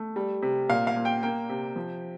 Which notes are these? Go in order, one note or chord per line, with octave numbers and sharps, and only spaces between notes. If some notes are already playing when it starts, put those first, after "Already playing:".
Already playing: A3
G3
C3
A#2 F5
F5
A#2
G5
A#3 G5
C3
F3